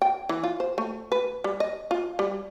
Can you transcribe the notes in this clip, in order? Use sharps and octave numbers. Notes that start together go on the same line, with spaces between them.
G5
E3
F4
C5
A3
B4
G3
D#5
F4
G3